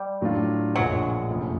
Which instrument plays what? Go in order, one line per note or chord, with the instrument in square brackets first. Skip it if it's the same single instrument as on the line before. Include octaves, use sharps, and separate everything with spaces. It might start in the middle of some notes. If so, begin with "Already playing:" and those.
Already playing: [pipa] G3
[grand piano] A2 F#3 A3 D4 F4
[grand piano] A#1 A#2 F3 G#3 [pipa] F#3
[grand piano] F#1 F2 C3 F3 A3